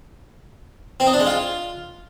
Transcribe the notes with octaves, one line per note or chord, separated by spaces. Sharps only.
C4
D#4
D4
G#3
F4